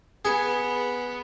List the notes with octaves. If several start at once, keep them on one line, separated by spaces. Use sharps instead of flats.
B3 G#4